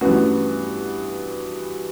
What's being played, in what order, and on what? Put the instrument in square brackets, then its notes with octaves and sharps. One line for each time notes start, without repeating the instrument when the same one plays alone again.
[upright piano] G2 E3 B3 F#4 [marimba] A3 C#4